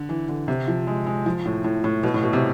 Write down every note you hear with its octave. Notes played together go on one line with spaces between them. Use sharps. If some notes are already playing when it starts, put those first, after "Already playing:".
Already playing: D3
E3
D3
C3
F3
G#3
G#3
F3
A2
A2
A2
B2
A2
B2
C3